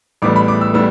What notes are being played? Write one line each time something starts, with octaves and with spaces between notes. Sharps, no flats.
A1 A2 G3 B3 D6
B5
D6
E6
A2 G3 B3 E6